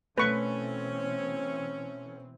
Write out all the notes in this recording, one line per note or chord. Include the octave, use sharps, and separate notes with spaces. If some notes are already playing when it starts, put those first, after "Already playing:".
B2 E3 A3 C4 C#4 B4 C#6